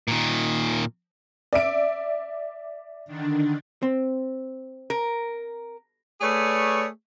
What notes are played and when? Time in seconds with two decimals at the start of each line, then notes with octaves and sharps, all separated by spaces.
0.08 A#2 D#3
1.53 D5 E5 D7
3.06 D3 D#3 D4
3.83 C4
4.90 A#4
6.21 A3 G#4 B4 C#5 D5